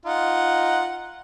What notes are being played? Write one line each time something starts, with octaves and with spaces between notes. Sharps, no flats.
D#4 F4 F#5